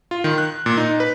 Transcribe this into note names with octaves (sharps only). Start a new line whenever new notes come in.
F4
D#3
F#6
A#2
D#4
B4